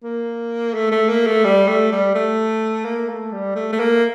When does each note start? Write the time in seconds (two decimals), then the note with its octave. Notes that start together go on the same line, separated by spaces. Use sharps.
0.03 A#3
0.74 A3
0.91 A3
1.09 A#3
1.27 A3
1.44 G3
1.68 A3
1.92 G3
2.15 A3
2.85 A#3
3.09 A3
3.33 G3
3.56 A3
3.73 A3
3.80 A#3